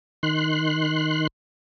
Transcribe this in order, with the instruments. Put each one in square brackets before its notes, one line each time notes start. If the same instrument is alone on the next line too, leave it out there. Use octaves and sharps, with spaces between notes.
[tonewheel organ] D#3 C6 F#6